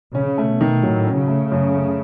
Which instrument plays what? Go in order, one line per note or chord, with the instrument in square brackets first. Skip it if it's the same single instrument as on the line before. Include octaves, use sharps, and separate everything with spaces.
[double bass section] C#3 [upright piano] C#4
[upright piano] A3
[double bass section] B2
[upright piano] D#3
[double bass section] A2 [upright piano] F#3
[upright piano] C#4
[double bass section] C#3
[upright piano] A3
F#2
A3